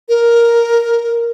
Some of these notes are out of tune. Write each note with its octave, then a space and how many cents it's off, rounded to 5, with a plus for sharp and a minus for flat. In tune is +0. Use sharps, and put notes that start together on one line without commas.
A#4 +5